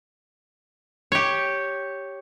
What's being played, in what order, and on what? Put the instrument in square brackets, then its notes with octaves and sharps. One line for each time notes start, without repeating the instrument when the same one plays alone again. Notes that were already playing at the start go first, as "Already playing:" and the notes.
[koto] G4 C#5